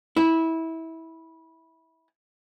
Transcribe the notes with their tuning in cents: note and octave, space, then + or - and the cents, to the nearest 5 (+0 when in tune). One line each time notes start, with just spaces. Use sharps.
E4 -20